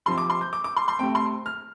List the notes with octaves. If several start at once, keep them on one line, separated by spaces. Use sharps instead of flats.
C3 F3 C4 C6
D6
C6
G6
D6
D6
C6
C6
C3 A3 C4 G5
C6
F6